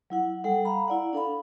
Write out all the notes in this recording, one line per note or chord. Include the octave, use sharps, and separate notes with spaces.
F#3 E4 F#5
G3 A4 F#5
F5 A#5 B5
E4 D5 F#5
D4 A4 F5 B5